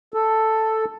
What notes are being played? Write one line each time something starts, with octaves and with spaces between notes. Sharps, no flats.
A4